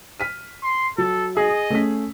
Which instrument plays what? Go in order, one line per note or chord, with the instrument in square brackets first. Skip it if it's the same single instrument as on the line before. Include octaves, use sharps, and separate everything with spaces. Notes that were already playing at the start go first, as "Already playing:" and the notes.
[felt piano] F6 B6 D#7
[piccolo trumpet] C6
[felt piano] F#3 [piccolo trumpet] A4
[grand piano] G#4 [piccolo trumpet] D#5
[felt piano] A3 C#4 B6